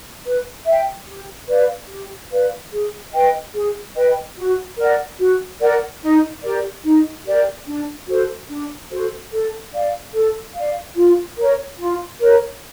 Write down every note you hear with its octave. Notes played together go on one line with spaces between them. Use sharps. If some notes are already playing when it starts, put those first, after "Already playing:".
B4
E5 G5
G4
B4 D5 F5
G4
B4 D5 F5
G#4
B4 D#5 G5
G#4
B4 D#5 G5
F#4
A#4 D5 F#5
F#4
A#4 D5 F#5
D#4
G4 A#4 D5
D#4
G4 A#4 D5
D4
F#4 A4 C5
D4
F#4 A4 C5
A4
D5 F5
A4
D5 F5
F4
A#4 C#5
F4
A#4 C#5